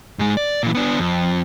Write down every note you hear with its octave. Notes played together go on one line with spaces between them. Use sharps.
G#2 G#3
D5
A#2 E3
B3 D4
F2